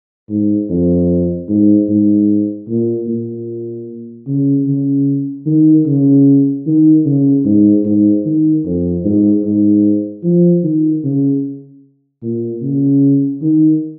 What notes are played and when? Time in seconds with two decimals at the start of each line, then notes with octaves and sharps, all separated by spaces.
0.30 G#2
0.70 F2
1.49 G#2
1.89 G#2
2.69 A#2
3.08 A#2
4.27 C#3
4.67 C#3
5.46 D#3
5.87 C#3
6.67 D#3
7.06 C#3
7.45 G#2
7.85 G#2
8.25 D#3
8.65 F2
9.05 G#2
9.44 G#2
10.23 F3
10.64 D#3
11.04 C#3
12.23 A#2
12.63 C#3
13.42 D#3